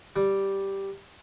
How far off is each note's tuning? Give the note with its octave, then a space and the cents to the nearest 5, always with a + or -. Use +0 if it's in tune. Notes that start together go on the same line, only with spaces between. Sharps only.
G3 -5